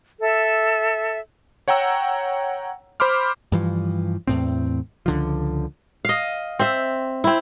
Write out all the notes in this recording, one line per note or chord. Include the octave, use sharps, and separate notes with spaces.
A4 E5
C#5 F#5 G5 A#5 E6
C5 B5 C6 D6 F6
G2 E3 F3
E2 A2 C4
C#2 D3 F3
D#5 F5
C4 E5
C4 E4